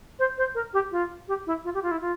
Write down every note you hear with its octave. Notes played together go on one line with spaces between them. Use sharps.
C5
C5
A#4
G4
F4
G4
E4
F4
G4
F4
E4
F4